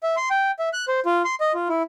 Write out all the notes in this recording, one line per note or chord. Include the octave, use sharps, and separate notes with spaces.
E5
C6
G5
E5
F#6
C5
F4
C6
D#5
F4
E4